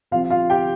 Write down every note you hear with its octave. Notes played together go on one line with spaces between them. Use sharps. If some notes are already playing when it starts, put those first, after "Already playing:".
C2 C3 F3 C4 F4 F5
F4 F5
G4 G5